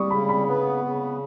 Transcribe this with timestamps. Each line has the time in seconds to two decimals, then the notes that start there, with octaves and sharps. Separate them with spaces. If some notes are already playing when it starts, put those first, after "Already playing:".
Already playing: G3 C#6 D#6
0.11 C#3 B5
0.29 B5
0.47 B3
0.85 C#3